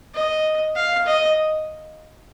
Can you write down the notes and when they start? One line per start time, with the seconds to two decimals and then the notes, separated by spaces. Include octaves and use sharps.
0.14 D#5
0.75 F5
1.06 D#5